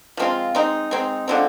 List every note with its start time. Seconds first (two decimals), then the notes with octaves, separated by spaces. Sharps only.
0.17 F3 G#3 C4 F4
0.55 G#3 C4 D#4
0.91 G#3 C4 D#4
1.28 D3 F3 G#3 C4